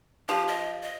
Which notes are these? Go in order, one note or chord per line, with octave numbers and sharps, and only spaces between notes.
F3 G4
D#5
D#5